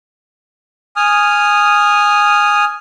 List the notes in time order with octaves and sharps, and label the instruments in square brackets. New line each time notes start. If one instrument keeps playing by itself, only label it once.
[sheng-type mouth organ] G#5 D#6 F6